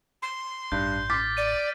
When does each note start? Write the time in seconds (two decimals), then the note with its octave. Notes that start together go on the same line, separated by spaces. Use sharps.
0.22 C6
0.72 A1 G2 G6
1.10 D6 F6 A6 B6
1.37 D5 D#7